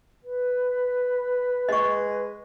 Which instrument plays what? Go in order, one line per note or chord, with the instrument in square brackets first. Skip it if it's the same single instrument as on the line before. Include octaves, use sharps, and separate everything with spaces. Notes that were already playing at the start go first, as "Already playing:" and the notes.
[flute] B4
[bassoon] G#3 [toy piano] D#5 C#6